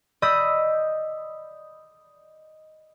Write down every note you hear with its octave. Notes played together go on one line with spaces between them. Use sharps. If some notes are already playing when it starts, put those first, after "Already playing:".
D5 D#5 B5 D#6 E6 G6